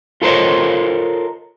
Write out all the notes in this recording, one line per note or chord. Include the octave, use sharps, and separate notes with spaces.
F4 A4 A#4 C5 C#5 D#5